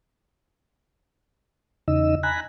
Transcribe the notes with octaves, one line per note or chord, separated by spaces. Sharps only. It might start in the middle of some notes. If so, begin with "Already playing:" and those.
E2 C#3 D#4 D#5 E6
G#5 A#5 B5 F#6